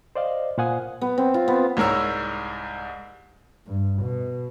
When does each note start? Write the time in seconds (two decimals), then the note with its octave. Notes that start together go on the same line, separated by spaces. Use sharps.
0.15 C5 D5 D#5 F5
0.58 A#2 C5 F5 F#5 G#5 D#6
1.01 B3
1.18 C4
1.34 F4
1.48 B3
1.77 C2 G#2 A#4 C#5 E6
3.67 G2
4.03 B2